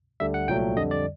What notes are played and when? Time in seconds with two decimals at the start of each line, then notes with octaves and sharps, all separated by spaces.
0.20 D2 D3 G3 E5
0.34 F#5
0.48 C2 A#2 F#3 A3 G5
0.77 F2 D3 G3 D#5
0.91 D5